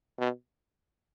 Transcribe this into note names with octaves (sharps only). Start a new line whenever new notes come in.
B2